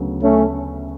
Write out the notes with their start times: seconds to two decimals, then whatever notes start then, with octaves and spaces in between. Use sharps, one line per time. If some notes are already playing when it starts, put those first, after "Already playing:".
Already playing: D2 C#3 F#3 B3
0.23 A3 C#4